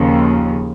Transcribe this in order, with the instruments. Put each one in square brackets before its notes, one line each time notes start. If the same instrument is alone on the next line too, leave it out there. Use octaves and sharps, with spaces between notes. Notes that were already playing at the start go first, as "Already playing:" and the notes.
Already playing: [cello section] D#2 C#3 F3